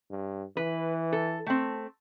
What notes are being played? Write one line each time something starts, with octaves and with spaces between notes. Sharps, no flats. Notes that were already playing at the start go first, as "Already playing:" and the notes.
G2
E3 B4
A4
A3 C4